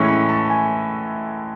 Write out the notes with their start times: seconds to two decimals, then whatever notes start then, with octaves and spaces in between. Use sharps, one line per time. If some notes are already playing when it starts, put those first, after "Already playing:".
Already playing: A2 E3 G#3 C#4 C#6
0.08 B5
0.29 A5
0.50 G#5